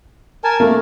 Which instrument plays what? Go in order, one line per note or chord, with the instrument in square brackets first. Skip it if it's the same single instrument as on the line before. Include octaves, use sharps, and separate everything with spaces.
[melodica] A#4 G#5 A5
[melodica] A3 [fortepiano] A#3